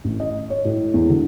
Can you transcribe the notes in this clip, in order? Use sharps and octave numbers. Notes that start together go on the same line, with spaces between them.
A1
D#5
C#5
A2
E2
D3